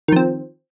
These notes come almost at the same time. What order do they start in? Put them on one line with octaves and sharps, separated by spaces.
D#3 F3 C4